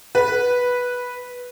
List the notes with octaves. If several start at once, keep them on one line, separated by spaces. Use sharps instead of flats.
B4